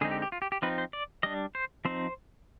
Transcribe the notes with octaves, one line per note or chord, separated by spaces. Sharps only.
D3 G#3 C4 D#4 G#4
G4
G4
F4
G4
G4
F3 C4 D#4 B4
C5
D5
G3 D4 D#5
C5
F3 C4 D#4 C5